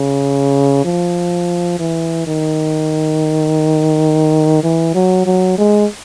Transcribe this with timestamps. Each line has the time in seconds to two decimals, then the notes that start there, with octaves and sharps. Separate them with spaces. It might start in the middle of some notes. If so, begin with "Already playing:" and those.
Already playing: C#3
0.84 F3
1.79 E3
2.27 D#3
4.63 E3
4.94 F#3
5.26 F#3
5.58 G#3